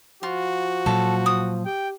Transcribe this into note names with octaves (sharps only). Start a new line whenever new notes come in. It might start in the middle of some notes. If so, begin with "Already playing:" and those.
F3 F4 F#4
A#2 F#3 A4
D#6
G4 G5